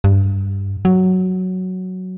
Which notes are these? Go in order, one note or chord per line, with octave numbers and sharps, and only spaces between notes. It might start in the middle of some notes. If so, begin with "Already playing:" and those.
G2
F#3